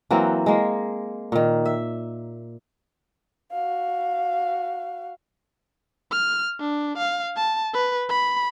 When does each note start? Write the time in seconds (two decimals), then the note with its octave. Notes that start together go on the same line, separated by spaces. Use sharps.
0.11 E3 F#3 A#3 C4
0.46 G#3 A#3
1.32 A#2 D#3
1.66 E5
3.52 F#4 F5
6.11 F6
6.60 D4
6.97 F5
7.36 A5
7.73 B4
8.09 B5